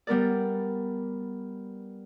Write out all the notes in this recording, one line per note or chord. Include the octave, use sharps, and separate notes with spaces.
G3 B3 A#4 D5